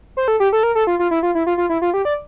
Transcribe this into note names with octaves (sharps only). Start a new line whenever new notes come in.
C5
A4
G4
A4
A#4
A4
F4
F4
E4
F4
E4
F4
F4
E4
F4
G4
D5